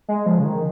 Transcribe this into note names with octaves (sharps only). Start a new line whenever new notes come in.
G#3
F3
C#3
D#3